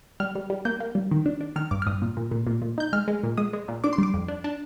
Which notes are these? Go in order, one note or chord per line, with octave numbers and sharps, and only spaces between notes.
G3 F6
G3
G3
A#3 G6
A#3
G3
D#3
D4
D4
D#3 F6
G2 D6
F6
G2 D#6
A#2
A#2
A#2
A#2
A#2
D#4 G6
G#3 F6
G#3
A#2
G#3 D#6
G#3
A#2
D4 D6
C6
G3 D6
F2
D4
D4